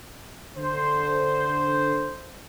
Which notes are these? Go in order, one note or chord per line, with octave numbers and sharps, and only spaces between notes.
D3 C5